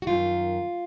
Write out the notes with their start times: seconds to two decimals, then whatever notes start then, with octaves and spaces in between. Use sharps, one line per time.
0.02 F#4
0.07 F#2 D#3 F4